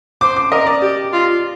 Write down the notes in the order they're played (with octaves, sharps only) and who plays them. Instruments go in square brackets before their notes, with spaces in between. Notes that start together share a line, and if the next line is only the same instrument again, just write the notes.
[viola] C5 [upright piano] D6
[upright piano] D6
[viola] A#4 [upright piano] D#5
[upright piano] D5
[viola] G4
F4